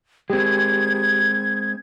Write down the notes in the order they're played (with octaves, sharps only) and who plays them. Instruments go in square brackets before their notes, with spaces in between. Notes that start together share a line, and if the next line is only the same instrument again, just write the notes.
[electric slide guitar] G#3 C4 [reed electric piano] G4 [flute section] G#6